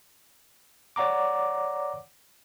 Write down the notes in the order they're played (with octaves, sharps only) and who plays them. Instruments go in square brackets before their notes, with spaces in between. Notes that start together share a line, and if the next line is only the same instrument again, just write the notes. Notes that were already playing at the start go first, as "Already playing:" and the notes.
[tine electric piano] C#5 D5 F#5 A#5 D6